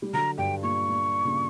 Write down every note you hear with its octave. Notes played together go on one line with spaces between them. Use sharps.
G3
D3 F#3 A#5
G2 G5
A#2 C#6
A#2
A#2 C#3